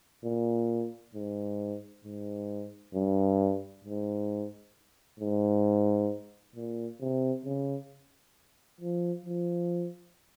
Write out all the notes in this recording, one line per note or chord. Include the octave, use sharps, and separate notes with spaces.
A#2
G#2
G#2
G2
G#2
G#2
A#2
C3
C#3
F3
F3